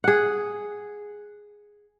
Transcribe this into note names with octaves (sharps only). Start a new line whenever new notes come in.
G#4 F#5